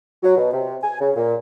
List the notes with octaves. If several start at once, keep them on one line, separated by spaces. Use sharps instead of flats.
F#3
B2
C3
G#5
C#3
A#2